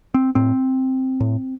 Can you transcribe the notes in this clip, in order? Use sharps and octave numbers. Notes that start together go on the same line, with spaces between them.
C4
A2 C4
A2